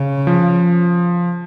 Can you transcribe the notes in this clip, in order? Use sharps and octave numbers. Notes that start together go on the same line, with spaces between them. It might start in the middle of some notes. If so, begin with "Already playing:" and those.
Already playing: C#3
F3